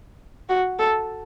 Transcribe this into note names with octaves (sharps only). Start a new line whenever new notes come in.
F#4
A4